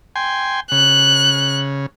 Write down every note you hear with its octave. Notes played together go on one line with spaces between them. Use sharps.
G5 G#5 C6
C#3 F#6